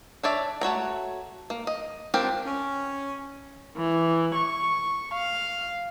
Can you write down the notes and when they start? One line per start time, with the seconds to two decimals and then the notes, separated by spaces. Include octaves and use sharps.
0.23 D4 C#5 D5 E5
0.61 A3 F#4 C#5 A#5
1.50 A#3
1.67 D#5
2.14 C4 D4 F4 G4 A#4
2.46 C#4
3.76 E3
4.35 C#6
5.14 F5